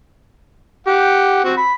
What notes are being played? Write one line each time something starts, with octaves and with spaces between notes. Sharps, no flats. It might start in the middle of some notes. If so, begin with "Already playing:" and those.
G4 F#5
C4 F#4
B5